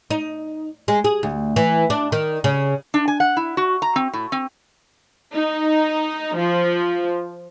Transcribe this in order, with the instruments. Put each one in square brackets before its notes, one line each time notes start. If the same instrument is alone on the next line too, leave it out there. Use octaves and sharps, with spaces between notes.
[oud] D#4
G#3
G#4
D2
E3
D4
D#3
C#3
[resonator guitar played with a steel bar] D4
G#5
F#5
E4
F#4
A#5
C4
A2
C4
[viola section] D#4
F3